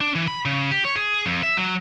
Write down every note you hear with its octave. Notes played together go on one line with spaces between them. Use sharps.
D4
E3
B5
C#3
G4
C#5
G#4
F2
E5
F#3